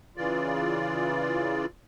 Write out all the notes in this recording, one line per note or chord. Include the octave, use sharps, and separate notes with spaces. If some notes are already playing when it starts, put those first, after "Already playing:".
C#3 E3 F4 D5